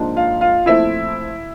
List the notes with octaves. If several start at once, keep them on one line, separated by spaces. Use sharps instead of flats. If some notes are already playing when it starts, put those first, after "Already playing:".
Already playing: G#2 F3 A#3 D4
F4 F5
F4 F5
A#2 F3 A3 C4 E4 E5